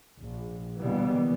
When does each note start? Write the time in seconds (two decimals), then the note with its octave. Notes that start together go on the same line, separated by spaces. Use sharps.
0.19 A#1
0.80 B2 D3 E3 G3 A#3 B3